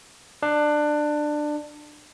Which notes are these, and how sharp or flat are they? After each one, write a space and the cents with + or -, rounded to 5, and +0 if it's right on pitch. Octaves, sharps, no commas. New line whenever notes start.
D4 +20